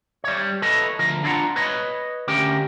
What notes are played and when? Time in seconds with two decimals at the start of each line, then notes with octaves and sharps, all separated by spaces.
0.24 G3 C#5
0.62 A4 B4 C#5 D#5 A5
0.99 D2 F3 A#4
1.24 D4 E4 F4 F5 F#5 A#5
1.56 B4 C#5 D#5
2.28 D2 C#4 G4 A#4 G5